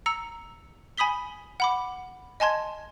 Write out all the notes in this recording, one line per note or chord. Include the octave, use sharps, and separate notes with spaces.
A#5 E6 C#7
G#5 B5 D#6 B6 G7
F#5 B5 D6
D#5 G#5 A5 C6 G#6